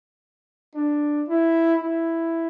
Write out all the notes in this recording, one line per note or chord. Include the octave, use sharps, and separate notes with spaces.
D4
E4
E4